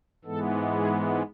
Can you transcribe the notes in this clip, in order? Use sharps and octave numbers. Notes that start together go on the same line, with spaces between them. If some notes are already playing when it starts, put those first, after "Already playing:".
G#2 E3 G#3 B3 A4
G#4